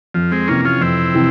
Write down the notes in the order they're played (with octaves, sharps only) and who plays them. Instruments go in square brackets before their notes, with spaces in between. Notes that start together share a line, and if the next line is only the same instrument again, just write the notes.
[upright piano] F2 [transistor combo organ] F3
[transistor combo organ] G#3 C4
[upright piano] C3 E3 [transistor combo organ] A#3 C#4
[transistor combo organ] C#4 F4
[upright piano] F2 [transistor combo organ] C4 E4
[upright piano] C3 E3